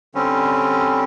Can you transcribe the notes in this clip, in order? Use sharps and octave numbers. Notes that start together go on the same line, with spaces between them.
D3 G3 C4 C#4